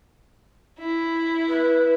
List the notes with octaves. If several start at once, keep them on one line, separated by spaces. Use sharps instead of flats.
E4
B4